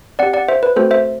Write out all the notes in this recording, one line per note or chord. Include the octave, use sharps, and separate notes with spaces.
C4 G4 D5 F#5
D5 F#5
C5 E5
B4
A3 C4 F#4 A4 C5
C5 E5